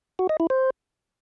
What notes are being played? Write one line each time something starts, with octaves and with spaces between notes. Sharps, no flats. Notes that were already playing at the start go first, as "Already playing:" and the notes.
F#4
D#5
E4
C5